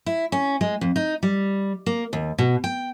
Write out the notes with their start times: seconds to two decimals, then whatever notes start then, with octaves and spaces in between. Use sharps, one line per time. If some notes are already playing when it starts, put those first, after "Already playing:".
0.06 E4
0.32 C#4
0.61 G#3
0.81 F2
0.96 D#4
1.23 G3
1.86 A#3
2.13 D#2
2.38 B2
2.64 G5